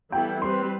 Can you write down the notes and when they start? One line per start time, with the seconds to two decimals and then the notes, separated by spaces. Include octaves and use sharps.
0.12 E3 G3 B3 E4 A4 G5
0.41 G3 C4 G4 B4 C6